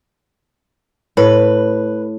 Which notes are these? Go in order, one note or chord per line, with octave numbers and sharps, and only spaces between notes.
A2 B4